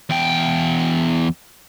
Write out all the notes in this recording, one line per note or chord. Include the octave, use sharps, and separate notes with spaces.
E2 G5